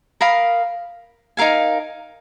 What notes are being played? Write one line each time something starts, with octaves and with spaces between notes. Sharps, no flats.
A#4 F5 B5 D#6
D#4 A#4 F5 G#5